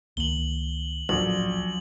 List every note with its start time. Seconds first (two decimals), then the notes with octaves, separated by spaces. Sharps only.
0.17 C#2 D#3 A#3 F#7 G7
1.09 D1 A#1 F#3 C#4 F#7